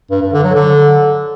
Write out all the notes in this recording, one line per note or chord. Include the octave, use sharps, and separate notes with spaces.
G2
G2
D3
F#3
D3